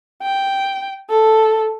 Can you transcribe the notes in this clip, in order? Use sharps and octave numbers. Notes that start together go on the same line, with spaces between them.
G5
A4